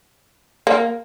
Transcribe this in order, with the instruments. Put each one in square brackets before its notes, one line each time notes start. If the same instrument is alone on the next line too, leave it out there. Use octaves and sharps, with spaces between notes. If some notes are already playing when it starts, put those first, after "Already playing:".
[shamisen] A#3